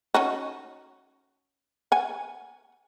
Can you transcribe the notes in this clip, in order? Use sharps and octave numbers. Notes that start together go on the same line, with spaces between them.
C#4 D#4 F#4
F#5 G#5